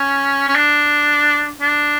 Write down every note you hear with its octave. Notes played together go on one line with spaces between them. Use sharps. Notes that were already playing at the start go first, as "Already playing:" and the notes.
Already playing: C#4
C#4
D4
D4